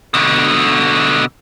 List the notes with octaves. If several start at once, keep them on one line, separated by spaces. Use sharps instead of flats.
B2 D3